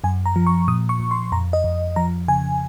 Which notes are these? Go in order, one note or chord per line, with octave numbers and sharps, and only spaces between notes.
F#2 G#5
A#5
F3
C#6
A#2 D#6
C#6
A#2
C6
F2 A#5
D#5
F2
F3 A#5
C#3 G#5